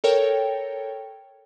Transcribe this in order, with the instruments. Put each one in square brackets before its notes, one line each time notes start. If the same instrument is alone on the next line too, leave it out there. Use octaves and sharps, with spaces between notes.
[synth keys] A4 A#4 C#5 G5